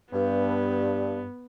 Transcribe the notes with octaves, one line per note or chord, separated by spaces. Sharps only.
G2 B3